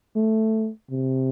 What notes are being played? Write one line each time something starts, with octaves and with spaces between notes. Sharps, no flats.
A3
C3